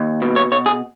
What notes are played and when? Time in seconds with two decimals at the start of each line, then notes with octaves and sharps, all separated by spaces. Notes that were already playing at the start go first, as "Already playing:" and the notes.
Already playing: D#2
0.22 B2
0.36 C#5
0.52 B2 C#5
0.66 G#4